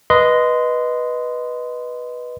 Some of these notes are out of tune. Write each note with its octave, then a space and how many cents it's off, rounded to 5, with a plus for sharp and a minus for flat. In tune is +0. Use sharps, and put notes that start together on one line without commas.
B4 -10 D#5 +0 C6 -20